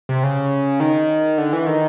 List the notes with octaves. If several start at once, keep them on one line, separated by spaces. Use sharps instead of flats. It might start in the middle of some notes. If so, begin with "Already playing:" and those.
C3
C#3
D#3
D3
E3
D#3